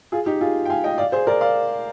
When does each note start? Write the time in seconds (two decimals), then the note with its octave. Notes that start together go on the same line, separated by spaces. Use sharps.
0.12 F4 G#4
0.26 D#4 G4
0.41 F4 G#4
0.65 G5
0.70 F5 G#5
0.84 D#5 G5
0.98 D5 F5
1.12 G#4 C5
1.27 A#4 D5
1.41 D5 F5